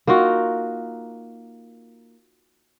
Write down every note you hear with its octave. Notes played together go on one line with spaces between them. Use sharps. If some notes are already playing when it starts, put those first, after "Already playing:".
A#3 D#4 F4 F#4